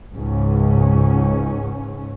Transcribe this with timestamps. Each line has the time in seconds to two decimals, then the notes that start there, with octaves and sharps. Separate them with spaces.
0.14 C#2 G#2 C#4